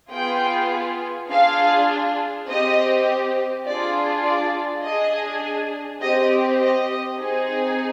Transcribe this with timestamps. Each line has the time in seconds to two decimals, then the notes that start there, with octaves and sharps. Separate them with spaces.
0.11 B3 F4 G#4 G5
1.30 D4 F4 G#4 F5
2.48 C4 G4 D#5
3.66 D4 F4 G#4 D5
4.24 D5
4.83 D4 G#4 D#5
6.01 C4 G4 D#5
6.60 D#5
7.19 C4 D#4 G#4